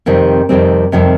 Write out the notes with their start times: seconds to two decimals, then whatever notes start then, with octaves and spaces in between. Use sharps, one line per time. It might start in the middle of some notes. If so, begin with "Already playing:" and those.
0.06 F2 C3 D#3 G3 C4
0.49 F2 C3 D#3 G3 C4
0.92 F2 C3 D#3 G3 C4